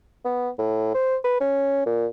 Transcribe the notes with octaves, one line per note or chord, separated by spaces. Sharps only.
B3
A2
C5
B4
C#4
A#2